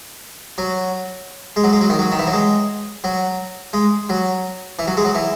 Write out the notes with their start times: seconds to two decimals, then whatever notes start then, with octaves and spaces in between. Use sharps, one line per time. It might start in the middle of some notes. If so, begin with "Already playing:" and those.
0.58 F#3
1.56 G#3
1.64 F#3
1.73 G#3
1.81 F#3
1.89 D#3
1.99 F#3
2.12 D#3
2.19 E3
2.27 F#3
2.33 G#3
3.04 F#3
3.73 G#3
4.09 F#3
4.79 E3
4.87 F#3
4.97 G#3
5.05 F#3
5.15 E3